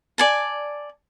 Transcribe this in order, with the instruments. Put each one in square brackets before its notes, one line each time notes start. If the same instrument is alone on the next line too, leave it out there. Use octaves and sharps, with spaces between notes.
[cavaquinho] D5 G#5 A5